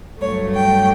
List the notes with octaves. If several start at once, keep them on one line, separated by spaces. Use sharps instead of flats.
G2 F#3 A3 C#5
G5